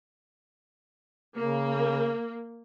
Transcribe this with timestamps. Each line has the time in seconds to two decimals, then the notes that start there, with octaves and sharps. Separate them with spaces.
1.37 C#3 A#3